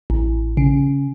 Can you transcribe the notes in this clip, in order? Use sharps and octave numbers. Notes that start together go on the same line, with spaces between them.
A1
C#3